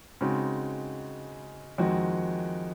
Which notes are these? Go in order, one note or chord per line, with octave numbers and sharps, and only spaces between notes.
C#3 G#3 C4 D#4 F#4
F2 D#3 G#3 C4 F#4